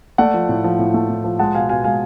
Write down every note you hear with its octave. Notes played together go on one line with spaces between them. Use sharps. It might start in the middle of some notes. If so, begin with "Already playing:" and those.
A3 D5 F#5
F3
A2
F3
A2
A3
A2
F3
G#3 F#5 A5
B2 F5 G#5
B2 F5 G#5
G#3 F5 G#5